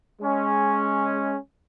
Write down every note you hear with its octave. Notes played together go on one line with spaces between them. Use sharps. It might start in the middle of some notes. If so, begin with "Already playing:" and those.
G#3 C#4